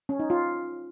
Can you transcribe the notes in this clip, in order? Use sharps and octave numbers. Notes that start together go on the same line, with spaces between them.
C#4
D#4
F4